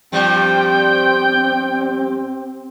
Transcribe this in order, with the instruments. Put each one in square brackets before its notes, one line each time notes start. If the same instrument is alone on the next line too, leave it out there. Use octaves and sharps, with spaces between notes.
[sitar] G2 F3 G3 [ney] C4 [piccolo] G5